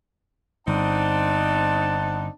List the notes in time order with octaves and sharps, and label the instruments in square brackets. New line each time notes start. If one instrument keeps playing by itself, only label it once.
[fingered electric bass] G1 [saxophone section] C4 D4 D#4 [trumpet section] C5 F#5 A5